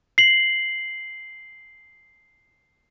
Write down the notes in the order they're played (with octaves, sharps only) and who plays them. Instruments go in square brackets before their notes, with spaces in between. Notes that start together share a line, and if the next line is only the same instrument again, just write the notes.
[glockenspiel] C7 F#7